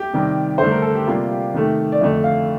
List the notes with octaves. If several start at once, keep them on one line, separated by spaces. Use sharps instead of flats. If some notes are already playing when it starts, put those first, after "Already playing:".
Already playing: G4
C3 D#3 G3
G2 D3 A3 C5
A#4
A4
G4
C3 G3 A#3 F4
G4
C3 D#3 A3
D5
F2 D3 A3 D#5
F5